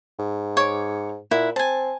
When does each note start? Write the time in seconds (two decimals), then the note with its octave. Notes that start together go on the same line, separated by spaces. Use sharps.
0.19 G#2
0.57 C#5 D6
1.31 A#2 E4 F#5
1.56 C4 G#5 A5